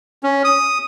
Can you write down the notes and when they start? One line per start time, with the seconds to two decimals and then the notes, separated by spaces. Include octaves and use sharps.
0.23 C#4
0.44 D#6